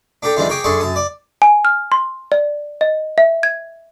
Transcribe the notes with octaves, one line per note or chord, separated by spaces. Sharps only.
D4 G4 A4 G5 A#5
D#3 E3 G3 G#3 D4 F4
G#4 A#4 C#5 G5 G#5 D6
F#2 D4 G#4 A4 C6 C#6
F#2 A5 D#6
D5
G#5
F6
C6
D5
D#5
E5
G#6